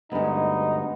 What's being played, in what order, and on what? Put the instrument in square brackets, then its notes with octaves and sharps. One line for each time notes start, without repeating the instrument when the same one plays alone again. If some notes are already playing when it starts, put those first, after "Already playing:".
[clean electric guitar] D2 G2 [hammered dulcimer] G#3 B3 [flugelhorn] D#4